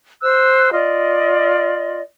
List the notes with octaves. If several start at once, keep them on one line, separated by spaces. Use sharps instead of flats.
C5 E6 F#6
F4 D5 D#5